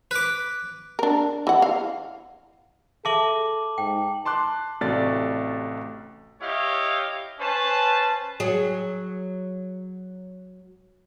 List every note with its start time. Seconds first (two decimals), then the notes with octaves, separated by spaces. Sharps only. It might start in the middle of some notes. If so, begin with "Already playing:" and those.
0.11 B4 D6
0.99 D4 A#4
1.47 E3 F#5
1.62 F5
3.05 G#4 A4 E5 A5 D6 F#7
3.78 G#2 G5
4.25 A5 C6 D6 F#6
4.81 A1 C3 A3 F#4 D5 A6
6.41 E4 G4 C#5 D#5 F5
7.40 C#4 B4 C5 A5
8.40 F#3 G#4